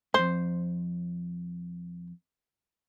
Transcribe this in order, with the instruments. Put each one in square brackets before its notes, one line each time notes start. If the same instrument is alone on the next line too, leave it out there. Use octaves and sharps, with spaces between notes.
[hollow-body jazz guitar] F2 G#2 [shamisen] C5